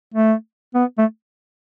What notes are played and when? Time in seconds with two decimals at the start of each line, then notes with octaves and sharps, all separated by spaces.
0.14 A3
0.75 B3
0.98 A3